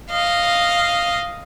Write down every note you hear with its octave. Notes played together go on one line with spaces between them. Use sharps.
D#5 F5